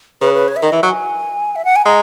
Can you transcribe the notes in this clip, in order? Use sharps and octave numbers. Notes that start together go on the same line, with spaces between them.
C#3 B4
B4
C#5
E5
D#3 D#5
E3
E5
F#3
G#5
E5
F#5
G#5
G#3 A#5